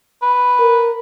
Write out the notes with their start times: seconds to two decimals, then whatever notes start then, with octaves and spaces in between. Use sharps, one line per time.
0.22 B4
0.59 A#4